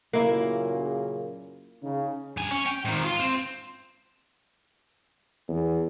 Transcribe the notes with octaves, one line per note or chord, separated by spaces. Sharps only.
F#2 A#2 C#3 A#3 E4
C#3 D#4
G2 G#5
C#4
G5
G#2 D#3
F4
C4
E2